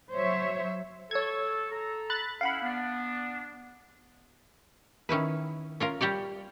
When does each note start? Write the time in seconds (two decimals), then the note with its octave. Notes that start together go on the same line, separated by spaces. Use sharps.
0.14 F#3 C5 C#5 E5
1.11 A4 C#5 G#6
1.71 A4 A#5
2.10 B5 F#6 A6
2.41 C#4 E4 F5 F#5 B5
2.62 B3 D4
5.09 D#3 C#4 E4 B4
5.80 C#4 F4 A#4
6.01 G3 G4 C#5 D5